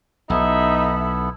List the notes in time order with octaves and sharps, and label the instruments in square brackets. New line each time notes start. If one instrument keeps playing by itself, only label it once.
[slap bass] B1 [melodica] B3 E4 A4 [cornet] D#4 [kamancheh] E5 B5